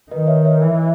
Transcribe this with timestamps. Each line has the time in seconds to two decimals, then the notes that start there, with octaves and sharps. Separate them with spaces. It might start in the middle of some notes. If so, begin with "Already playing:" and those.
0.11 D#3 B4 D#5
0.27 C#5 E5
0.45 C#5 E5
0.61 E3 E5